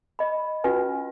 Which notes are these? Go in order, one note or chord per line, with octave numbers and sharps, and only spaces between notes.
D#5 B5
C#4 F4 F#4 B4 G#5